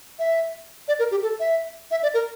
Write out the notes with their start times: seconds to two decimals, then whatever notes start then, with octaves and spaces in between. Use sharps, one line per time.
0.19 E5
0.88 D5
0.99 A#4
1.11 G4
1.22 A4
1.40 E5
1.91 E5
2.03 D5
2.14 A#4